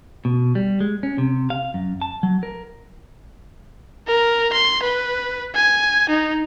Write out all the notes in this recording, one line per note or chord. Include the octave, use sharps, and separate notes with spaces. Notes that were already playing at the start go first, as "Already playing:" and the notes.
B2
G3
G#3
C#4
C3
F5
F#2
A5
F#3
A#4
A#4
C6
B4
G#5
D#4